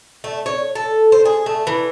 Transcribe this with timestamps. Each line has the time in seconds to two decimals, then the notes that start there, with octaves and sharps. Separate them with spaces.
0.24 A3
0.46 C#5
0.75 A4
1.12 C5
1.26 G#4
1.46 A3
1.67 E3